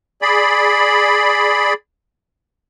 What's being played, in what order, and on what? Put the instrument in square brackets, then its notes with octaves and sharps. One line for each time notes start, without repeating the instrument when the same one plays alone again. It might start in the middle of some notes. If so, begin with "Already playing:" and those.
[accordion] G#4 D5 B5